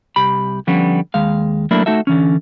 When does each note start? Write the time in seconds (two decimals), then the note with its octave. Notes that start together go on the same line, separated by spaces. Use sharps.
0.16 C2 G4 B5
0.67 D3 F3 G3 B3 C#4
1.14 D#2 G#3 F5
1.71 F#3 A3 A#3 D4 E4
1.86 A3 D#4 F#4 A4 E5
2.07 D3 E3 C#4